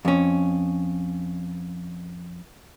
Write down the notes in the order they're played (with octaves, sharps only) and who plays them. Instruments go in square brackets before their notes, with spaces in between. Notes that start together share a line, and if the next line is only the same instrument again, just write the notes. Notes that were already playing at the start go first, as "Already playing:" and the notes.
[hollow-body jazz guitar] F2 C#4